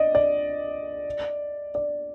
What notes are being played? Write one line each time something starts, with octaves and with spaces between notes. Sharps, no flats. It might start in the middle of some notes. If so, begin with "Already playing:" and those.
Already playing: D5 D#5
D5
D5